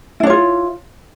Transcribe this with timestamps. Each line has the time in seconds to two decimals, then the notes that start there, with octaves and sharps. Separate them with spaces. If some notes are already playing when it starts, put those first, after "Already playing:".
0.20 E4
0.23 D4
0.27 C#5
0.30 F4